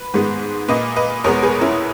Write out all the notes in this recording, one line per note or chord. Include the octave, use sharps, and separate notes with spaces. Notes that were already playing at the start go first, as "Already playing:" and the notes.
Already playing: B4
G#2 D#3 G#3 B3
A#2 A#3 B4 D#5
B4 D#5
E2 B2 G#3 B3 A#4 C#5
G#4 B4
C#4 E4